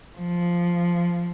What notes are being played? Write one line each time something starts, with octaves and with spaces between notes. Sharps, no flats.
F3